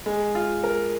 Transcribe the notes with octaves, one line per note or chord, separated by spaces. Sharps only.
G#3
F4
A#4